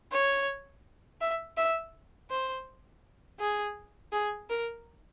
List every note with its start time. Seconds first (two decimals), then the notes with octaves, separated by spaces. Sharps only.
0.12 C#5
1.21 E5
1.57 E5
2.30 C5
3.39 G#4
4.12 G#4
4.50 A#4